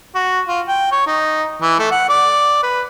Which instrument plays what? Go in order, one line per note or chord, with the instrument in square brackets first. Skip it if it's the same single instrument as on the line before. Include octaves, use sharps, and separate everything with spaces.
[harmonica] F#4
F4
G5
C#5
D#4
E3
A3
F#5
D5
B4